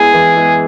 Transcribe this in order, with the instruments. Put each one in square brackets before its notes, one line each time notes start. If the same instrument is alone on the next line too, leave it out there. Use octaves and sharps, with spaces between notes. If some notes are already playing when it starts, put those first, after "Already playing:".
Already playing: [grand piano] G#3 B3 E4 [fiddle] G#4
[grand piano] E3
G#3 B3 E4